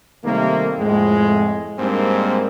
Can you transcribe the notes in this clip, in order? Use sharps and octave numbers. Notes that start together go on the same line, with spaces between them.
C3 D#3 G3 A3 A#3
F2 A2 G#3
G#2 G3 A#3 C4 D4 A#4